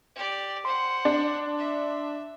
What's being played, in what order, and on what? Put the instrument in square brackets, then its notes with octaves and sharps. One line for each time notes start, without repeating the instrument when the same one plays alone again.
[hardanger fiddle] G4 D5
[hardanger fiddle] C5 F#5 [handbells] C6
[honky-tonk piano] D4
[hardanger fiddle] E5